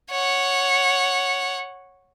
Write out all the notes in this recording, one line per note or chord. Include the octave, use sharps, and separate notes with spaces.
C#5 F#5